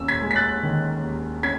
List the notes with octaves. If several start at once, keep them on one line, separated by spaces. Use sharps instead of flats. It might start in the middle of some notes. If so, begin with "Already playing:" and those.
Already playing: D#2 C#4 E6
G#6 B6
G#3
B6
F#6 A6
D#3
D#2
C#4 G#6 B6